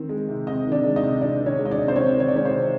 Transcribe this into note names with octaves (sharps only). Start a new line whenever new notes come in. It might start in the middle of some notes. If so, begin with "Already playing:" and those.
Already playing: D#3 C4
G#3
C3
C4 D#4 D#5
D#3
D4 D5
G#3
D#4 D#5
C3
C4 D4 D5
D#3
C#4 C#5
G#3
D#5
D4 D5
C3
C5
C4 C#4 C#5
D#3
C#5
D5
G#3 C#4 C#5
C5
C3